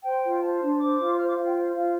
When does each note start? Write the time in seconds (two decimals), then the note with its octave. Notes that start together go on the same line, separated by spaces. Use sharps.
0.03 C5 G5
0.23 F4
0.41 C5 A5
0.60 D4
0.79 C5 D6
0.98 F4
1.18 C5 F6
1.27 D6
1.37 F4 F5
1.46 G5
1.56 C5
1.75 F4 F5